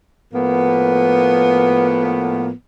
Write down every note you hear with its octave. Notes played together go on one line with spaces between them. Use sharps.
A2 F3 A#3 B3